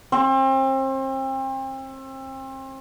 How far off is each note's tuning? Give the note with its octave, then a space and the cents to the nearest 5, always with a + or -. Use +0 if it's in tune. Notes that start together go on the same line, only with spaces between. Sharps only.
C4 +35